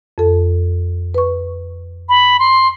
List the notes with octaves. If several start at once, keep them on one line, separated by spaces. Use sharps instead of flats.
F2 A4
B4 C#6
B5
C6